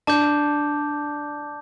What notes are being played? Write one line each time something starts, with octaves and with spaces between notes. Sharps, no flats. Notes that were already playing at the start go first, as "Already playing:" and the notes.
D4 A5 D6 G6